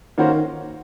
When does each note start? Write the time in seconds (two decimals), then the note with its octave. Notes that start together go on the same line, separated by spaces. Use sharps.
0.18 D#3 A#3 C#4 F#4 C5